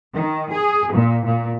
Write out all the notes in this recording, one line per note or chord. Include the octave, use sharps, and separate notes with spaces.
D#3
G#4
A#2
A#2